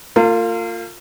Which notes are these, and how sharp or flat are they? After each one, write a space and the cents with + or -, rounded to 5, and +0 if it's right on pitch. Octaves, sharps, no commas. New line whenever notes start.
A#3 -40 F4 +0